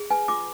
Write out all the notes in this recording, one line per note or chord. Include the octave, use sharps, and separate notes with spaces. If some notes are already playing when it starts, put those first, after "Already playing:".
Already playing: G#4
B4 G#5
F4 D6